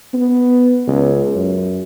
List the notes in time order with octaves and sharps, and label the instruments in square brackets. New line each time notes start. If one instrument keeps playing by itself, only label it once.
[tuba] B3
C#2
F#2